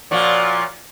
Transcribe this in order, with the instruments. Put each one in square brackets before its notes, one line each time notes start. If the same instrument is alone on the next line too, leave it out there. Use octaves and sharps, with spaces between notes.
[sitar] A#2 F3 [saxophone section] F#4 C#5 D5